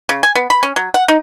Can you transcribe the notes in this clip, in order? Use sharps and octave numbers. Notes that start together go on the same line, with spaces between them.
C#3
G#5
B3
B5
C#4
F#3
F#5
D#4